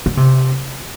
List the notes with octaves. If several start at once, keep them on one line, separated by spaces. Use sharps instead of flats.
D3
C3